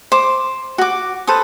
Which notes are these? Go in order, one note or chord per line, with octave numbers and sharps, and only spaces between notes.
C5 D6
F#4 D6
A4 B4 C5 D#6